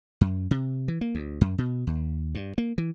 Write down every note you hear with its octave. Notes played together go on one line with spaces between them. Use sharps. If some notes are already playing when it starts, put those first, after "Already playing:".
F#2
C3
E3
A#3
D2
F#2
B2
D#2
G2
A#3
E3